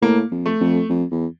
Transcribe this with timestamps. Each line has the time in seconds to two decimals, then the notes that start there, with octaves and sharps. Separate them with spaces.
0.02 A2 A#3
0.31 F2
0.46 A3
0.61 F2
0.89 F2
1.11 E2